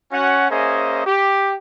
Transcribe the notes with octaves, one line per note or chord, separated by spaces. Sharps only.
C#4 F#4 F#5
A#3 C#4 G#4 C5 D#5 E5
G4